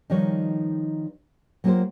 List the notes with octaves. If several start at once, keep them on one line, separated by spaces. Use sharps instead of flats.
D#3 F3 G3 D#4 B4 C#5
F#3 A#3 B3 F4 G4 C5